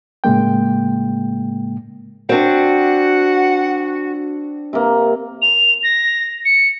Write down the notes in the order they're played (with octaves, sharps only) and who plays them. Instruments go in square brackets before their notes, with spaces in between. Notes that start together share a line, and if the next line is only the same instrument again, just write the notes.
[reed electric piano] A2 C#3 G#3 A#3 G5
[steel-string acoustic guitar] C4 D4 [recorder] F#4 [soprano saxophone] F#5
[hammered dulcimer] C3 A#3
[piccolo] F7
A#6
C#7